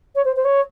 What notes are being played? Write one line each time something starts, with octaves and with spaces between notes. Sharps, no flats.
C#5
C5
C5
C#5